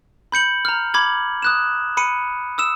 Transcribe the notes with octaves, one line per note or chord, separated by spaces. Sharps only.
B5 G6 C#7 F#7
A#5 F6
B5 D6 G#6 F#7
D#6 F#6 E7
B5 C#7 D#7
D#6 E6 E7